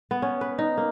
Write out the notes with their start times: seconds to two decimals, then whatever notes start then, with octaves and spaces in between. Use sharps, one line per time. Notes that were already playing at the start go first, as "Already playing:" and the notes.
0.11 B3
0.22 C#4
0.41 B4
0.59 D#4
0.78 A#3